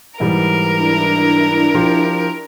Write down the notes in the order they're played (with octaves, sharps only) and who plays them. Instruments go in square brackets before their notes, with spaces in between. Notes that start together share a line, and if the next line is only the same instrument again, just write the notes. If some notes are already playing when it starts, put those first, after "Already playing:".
[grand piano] G#2 E3 G3 [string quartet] A#4
[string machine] D4 E4
[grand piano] F3 F4 G4